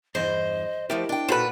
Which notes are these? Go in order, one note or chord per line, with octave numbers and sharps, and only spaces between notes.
E2 G2 E3 C5 D#5
F3 A3 E4 G4 A#4 D#5 E5
D4 G5
A#2 D#4 F#4 A4 B4 C5 F#5